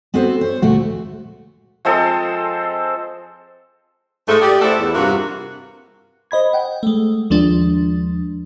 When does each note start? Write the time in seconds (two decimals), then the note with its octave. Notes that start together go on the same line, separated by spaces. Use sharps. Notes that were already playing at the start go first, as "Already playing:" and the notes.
0.14 B3 C4 F#4 A4 C5
0.41 C5 C#5
0.62 D2 A#2 A3 F#4
1.85 F3 G#3 C4 A4
4.28 G#2 A3
4.42 G4 G#4 D5
4.62 A3 E4 A4 C5 D5 F#5
4.80 E2
4.95 G2 C3 A#3 F4 F#4
6.31 C5 D#5 B5 G#6
6.53 F#5 G5
6.83 G#3 A3
7.30 D#2 F3 G#3 D4